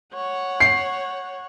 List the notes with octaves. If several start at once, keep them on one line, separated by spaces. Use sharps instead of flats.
C#5 F#5
C7